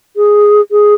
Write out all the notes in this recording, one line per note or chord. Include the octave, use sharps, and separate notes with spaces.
G#4
G#4